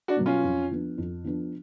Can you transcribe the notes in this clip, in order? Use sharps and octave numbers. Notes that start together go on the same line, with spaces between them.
D4 F#4
B2 F#3 B3
C#4 F4
F2
F3 B3 D4
F2
F3 B3 D4